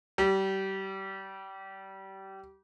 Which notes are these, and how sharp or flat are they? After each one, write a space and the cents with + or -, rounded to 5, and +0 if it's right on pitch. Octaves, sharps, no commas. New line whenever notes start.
G3 -25